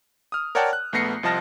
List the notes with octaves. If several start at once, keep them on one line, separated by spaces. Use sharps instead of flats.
D#6 F6
A#4 C#5 D5 F#5 G5 A5
F#6
A#1 A3 B3 A#6 C7 C#7
C2 F3 D#5 A5 F6 A#6